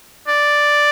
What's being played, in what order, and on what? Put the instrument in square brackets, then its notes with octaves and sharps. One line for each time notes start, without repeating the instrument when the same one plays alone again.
[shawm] D5